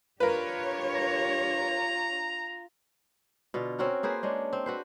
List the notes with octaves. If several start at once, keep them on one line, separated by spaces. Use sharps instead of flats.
D4 F4 G4 A#4 B4 C#5
A#5
B2 D3 F4
C4 C#4 F#4 A#4
A#3 G#4 B4 C5
G#3 C#4 D4
C4
F#4 B4 C5